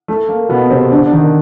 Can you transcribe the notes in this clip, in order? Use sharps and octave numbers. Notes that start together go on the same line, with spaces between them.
A3
A#3
B2 B3
C3 C4
D3 D4
D4
D#3 D#4